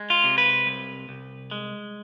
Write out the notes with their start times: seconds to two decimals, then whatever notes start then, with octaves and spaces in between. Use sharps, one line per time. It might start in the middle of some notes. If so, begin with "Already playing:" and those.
Already playing: G#3
0.10 F4
0.24 C3
0.38 B4
0.66 C2
1.09 C2
1.51 G#3